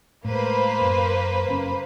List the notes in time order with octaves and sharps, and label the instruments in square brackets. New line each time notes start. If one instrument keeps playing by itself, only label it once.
[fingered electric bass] A2 G#3 [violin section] A#3 B4 C5
[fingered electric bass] F#2
F#1 C#4